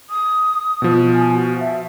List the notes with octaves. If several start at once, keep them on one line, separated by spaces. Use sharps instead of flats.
D#6
B2 F3
G#5
F#4
E5